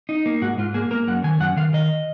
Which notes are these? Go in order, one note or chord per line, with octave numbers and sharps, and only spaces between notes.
D#4
A#3
G#2 F#4
G#2 F4
A#3 G#4
A#3 A#4
F#2 F#5
D#3 G#5
F#2 F#5
D#3 F5
D#3 D#5